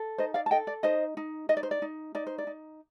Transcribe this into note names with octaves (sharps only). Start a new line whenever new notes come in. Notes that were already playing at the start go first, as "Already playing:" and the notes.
Already playing: A4
D#4 C5 D#5
D5 F5
A5
A4 D#5 G5
D5
D#4 C5 D#5
D#4
D#4 D#5
D5
C5
D5
D#4
D#4 D5
C5
D5
D#4